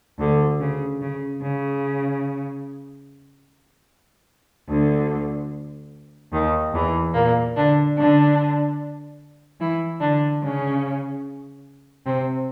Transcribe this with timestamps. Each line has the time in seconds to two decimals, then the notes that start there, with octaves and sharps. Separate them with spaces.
0.19 D2 D3
0.60 C#3
1.01 C#3
1.42 C#3
4.69 D2 D3
6.32 D#2 D#3
6.73 E2 E3
7.14 A#2 A#3
7.55 D3 D4
7.96 D3 D4
9.60 E3 E4
10.00 D3 D4
10.42 C#3 C#4
12.05 C3 C4